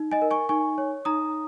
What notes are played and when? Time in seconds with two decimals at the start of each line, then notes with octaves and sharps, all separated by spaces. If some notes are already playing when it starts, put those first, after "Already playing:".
Already playing: D#4
0.11 D#5 G#5
0.22 A#4
0.31 G#5 C#6
0.49 D#4 G#5 C#6
0.78 C#5
1.05 D#4 A#5 D#6